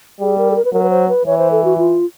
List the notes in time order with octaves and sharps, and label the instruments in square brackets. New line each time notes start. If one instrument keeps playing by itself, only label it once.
[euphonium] G3 [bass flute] G#4
[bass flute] A#4
A4
A#4
B4
[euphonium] F#3 [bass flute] A#4
[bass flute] B4
C5
B4
[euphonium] E3 [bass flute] C#5
[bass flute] C5
A4
F#4
F4